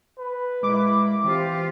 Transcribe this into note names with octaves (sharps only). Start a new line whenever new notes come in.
B4
A#2 G#3 E4 D6
E3 C4 F4 G4